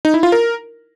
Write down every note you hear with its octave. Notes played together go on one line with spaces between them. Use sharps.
D#4
E4
F4
A#4